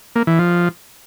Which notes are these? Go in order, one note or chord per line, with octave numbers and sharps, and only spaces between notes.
A#3
E3
F3